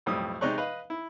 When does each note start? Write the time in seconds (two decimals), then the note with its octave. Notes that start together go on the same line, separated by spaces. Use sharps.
0.06 B1 F2 A2 G3 D#6
0.41 C3 G#3 D#4 D5 C#6 F#6
0.58 B4 D#5 F5 B5
0.90 E4